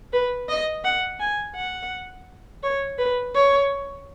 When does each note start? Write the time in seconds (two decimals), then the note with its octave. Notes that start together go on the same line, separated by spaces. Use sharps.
0.13 B4
0.49 D#5
0.84 F#5
1.20 G#5
1.56 F#5
2.63 C#5
2.98 B4
3.35 C#5